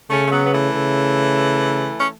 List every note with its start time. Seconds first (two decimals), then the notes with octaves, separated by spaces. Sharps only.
0.10 C#3 A3 C#4
0.27 A3
0.32 F#3 B3
0.45 B3
0.53 E3 A3
0.75 C#3
2.00 C#4